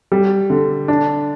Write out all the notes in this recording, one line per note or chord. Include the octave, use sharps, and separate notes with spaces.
G3
D3
D4